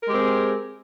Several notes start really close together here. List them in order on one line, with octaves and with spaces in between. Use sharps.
A#4 G#3 G4 C4 G#4